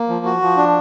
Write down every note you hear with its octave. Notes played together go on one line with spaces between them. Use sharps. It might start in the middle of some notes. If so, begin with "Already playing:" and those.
Already playing: A#3
F3
F#4
F3
D4